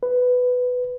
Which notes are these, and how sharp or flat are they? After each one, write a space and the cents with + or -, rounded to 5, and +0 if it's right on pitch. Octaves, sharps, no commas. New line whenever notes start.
B4 +10